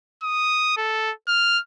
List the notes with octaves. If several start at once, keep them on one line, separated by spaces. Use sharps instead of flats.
D#6
A4
F6